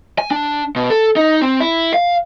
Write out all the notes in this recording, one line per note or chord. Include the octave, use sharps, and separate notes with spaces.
G#5
D4
B2
A4
D#4
C4
E4
F5